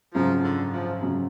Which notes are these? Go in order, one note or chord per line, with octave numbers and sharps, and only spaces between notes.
G#1 F#2 C#3 F3 F#3
D3
F3
F#2 C#3 F#3